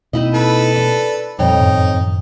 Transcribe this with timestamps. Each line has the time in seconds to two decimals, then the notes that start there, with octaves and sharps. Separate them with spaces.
0.13 B2 A#3 C4 D#4 E4 D#5
0.34 A4 B4
0.76 D4
1.39 F2 A#2 G3 D#4 C#5 G5
1.59 F#2 A2 D#3